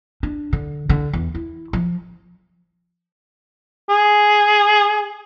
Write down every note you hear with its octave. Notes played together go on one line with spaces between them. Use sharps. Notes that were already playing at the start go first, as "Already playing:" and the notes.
D4
D3
D3
E2
E4
F3
G#4